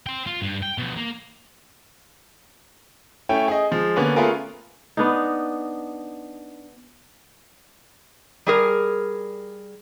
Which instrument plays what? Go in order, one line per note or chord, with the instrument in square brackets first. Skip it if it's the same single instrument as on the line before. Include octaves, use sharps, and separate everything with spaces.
[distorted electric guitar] C5 G5
F4
G2
G5
B2 F3
A#3
[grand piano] A3 C#4 E4 G5
G#4 D#5
F3 G#3
D3 A#3 B3 C#4
A3 B3 C#4 F4 G#4 A#4
[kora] B3 D4 D#4
[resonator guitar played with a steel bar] G3 G#4 A#4